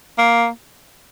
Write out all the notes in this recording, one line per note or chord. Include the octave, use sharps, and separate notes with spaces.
A#3